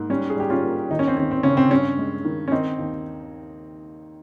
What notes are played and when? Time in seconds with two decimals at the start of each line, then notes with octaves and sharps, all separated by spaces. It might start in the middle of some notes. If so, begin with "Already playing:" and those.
Already playing: G#2 A#3
0.10 G3 C#4
0.30 G#4
0.37 G3 G4
0.50 C#4 F4
0.63 A#3
0.90 D#2 D#4
0.99 C#4
1.08 C4
1.17 D#2 C#4
1.31 C4
1.43 C#3 C#4
1.57 C4
1.71 G2 C#4
1.99 G#3
2.25 D#3
2.48 C#4
2.51 D#3 C4 D#4
2.78 D#2